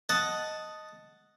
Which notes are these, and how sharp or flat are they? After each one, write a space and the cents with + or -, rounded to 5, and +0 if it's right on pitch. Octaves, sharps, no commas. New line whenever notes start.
D#5 +0 F#5 +0 A5 +0